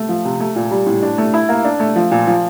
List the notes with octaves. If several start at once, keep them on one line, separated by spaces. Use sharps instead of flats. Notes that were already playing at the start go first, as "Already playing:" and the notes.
Already playing: A3
F3
C3
A3
A#2
G3
A2
D4
A3
E4
A#3
D4
A3
F3
A#2
F3